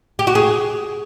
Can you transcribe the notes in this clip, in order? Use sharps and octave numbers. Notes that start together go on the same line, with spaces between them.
G4
F#4
G#4